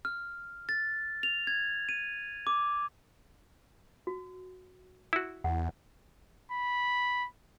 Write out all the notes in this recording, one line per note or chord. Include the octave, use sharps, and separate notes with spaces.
F6
A6
F7
G#6
D#7
D6
F#4
E4 F#4
E2 F#5
B5